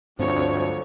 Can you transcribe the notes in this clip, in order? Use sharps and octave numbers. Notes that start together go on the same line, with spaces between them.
D2 G2 F3 F#3 C4 C#5